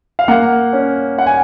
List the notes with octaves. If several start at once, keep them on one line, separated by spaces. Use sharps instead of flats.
F5
A#3 F#5
C#4
F#5
G#5